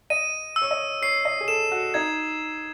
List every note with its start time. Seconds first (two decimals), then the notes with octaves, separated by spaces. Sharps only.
0.10 D#5 D#7
0.56 E6
0.62 C#5
0.71 D#5
1.02 C#5 C7
1.25 D#5
1.41 G#4
1.48 A4 E7
1.72 F#4
1.94 D#4 G#6